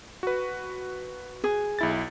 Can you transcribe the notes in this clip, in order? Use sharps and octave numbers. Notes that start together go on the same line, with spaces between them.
F#4 B4
G#4
B1 E4 A6